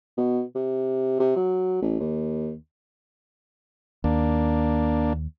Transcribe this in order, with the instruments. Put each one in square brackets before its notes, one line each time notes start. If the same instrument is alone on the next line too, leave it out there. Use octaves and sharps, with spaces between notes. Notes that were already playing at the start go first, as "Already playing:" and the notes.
[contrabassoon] B2
C3
C3
F#3
A1
D#2
[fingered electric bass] D#2 [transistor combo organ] A#3 D4